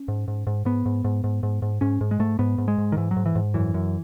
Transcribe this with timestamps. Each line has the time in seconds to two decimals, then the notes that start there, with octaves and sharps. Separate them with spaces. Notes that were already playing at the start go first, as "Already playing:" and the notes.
Already playing: C#4
0.08 G#2
0.28 G#2
0.47 G#2
0.65 G#2 B3
0.86 G#2
1.04 G#2
1.24 G#2
1.43 G#2
1.62 G#2
1.81 G#2 C#4
2.01 G#2
2.11 G#3
2.19 G#2 A3
2.39 G#2 B3
2.58 G#2
2.68 G#3
2.78 G#2
2.92 D#3
2.97 G#2 E3
3.11 F#3
3.16 G#2
3.26 E3
3.35 G#2
3.54 F#2 E3
3.74 F#2